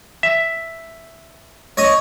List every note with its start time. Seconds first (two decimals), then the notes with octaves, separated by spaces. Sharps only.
0.23 E5
1.77 C#5 D#5